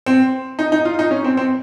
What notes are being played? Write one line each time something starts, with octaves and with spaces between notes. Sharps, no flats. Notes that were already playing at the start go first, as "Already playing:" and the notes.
C4
D#4
D#4
F4
D#4
C#4
C4
C4